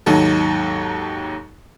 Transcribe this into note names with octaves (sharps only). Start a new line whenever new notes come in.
D#2 G#2 F#3 D#4 A4